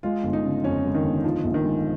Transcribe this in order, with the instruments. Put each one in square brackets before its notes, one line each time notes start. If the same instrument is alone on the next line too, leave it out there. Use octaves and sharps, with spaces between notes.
[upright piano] G#3 [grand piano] F4
[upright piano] G1
[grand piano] D#4
[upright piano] C#3
[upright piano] F2 [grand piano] C#4
[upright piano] G#3
[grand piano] D#3
[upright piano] G1
[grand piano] F3 [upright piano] D#4
[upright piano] A#1
[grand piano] D#3
[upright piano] G#3